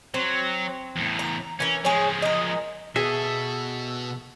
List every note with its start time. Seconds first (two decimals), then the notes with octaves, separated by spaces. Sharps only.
0.14 F#3 C4
0.96 E2 A2
1.19 A#5
1.60 E3 C#4 A#4
1.85 F3 G#3 G#4 C#5
2.22 A#4 D#5
2.96 B2 G#4 A4 E5